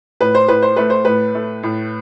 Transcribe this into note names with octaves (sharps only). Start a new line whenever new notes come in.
A2 B4
C5
A2 B4
C5
A3 B4
C5
A2 B4
A3
A2